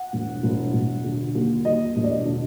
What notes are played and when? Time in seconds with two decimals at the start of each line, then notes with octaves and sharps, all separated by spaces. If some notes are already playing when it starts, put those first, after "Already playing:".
Already playing: F#5
0.13 E1
0.43 E1
0.73 E1
1.04 D3
1.35 D#2
1.65 D#2 D#5
1.96 E1
2.04 D5
2.10 D#5
2.25 D3